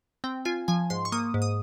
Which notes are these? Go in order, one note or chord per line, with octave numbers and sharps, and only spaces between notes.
C4 G5
F4 G#5
F3 G#5
G#2 C6
C#6
A#3 D#6
G#2
D#6